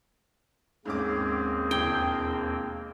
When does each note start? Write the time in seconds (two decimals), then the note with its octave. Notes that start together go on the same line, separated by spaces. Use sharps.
0.86 D#2 G#2 A#3 C4 C#4 G#4 D6
1.71 E1 G5